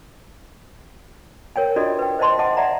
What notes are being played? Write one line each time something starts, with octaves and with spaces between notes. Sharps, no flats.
A#4 C#5 G5 G#5
D4 F4 F#4 A4 D5 D#5
B4 G5
C5 D5 D#5 A5 C6
D#5 F#5 G#5 A5 C6 D6
D5 E5 F#5 A#5